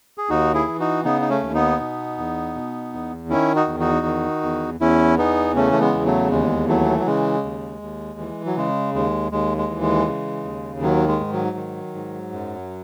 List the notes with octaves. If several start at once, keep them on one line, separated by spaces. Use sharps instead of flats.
G#4
D#2 D#4 F#4
E4 G#4
E3
D#4 F#4
C#3 B3 D#4
D#4
A3 C#4
D#2
B3 D#4
B2
E2
B2
E2
D#3 C#4 E4
D#4 F#4
E2
D#4 F#4
D#3
E2
E2 C#4 E4
E3 B3 D#4
C#3 A3 C#4
A3
G#3 B3
E2
F#3 A3
D#2 G#3
E3 F#3 A3
F#3
C#3 G#3
D#2
D#2
E3
F#3
C#3 G#3
D#2 G#3
D#2 G#3
G#3
E3
G#3
C#3
D#2
D#3 F#3
G#3
G#2
F#3
D#3
G#2
F#2